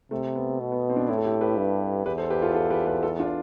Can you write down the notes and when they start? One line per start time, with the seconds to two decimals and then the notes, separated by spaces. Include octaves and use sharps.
0.11 C3 A3
0.36 B3
0.60 B2
0.72 B3
0.89 C4
0.96 B3 D4
1.08 A2 C4 E4
1.18 A4
1.25 E4 G4
1.41 G4 B4
1.57 G2
2.06 E2 G4 B4
2.18 A4 C5
2.30 G4 B4
2.42 F4 A4
2.55 F4 A4
2.70 G4 B4
2.87 G4 B4
3.03 F4 A4
3.19 D4 F4